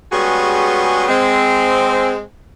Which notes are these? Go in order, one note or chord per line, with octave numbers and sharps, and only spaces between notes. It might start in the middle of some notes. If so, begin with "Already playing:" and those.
G3 G#3 B3 C#4 F#4 G#4
G#3 C4